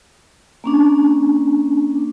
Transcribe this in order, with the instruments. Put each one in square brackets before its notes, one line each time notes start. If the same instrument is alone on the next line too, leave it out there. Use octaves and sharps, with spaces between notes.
[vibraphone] A#3 C#4 D4